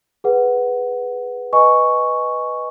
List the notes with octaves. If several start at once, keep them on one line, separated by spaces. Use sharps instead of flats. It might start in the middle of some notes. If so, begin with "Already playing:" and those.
G#4 B4 F#5
B4 D#5 G#5 C#6